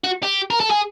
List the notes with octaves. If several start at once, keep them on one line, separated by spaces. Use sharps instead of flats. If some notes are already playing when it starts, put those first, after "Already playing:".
F#4
G4
A#4
A4
G#4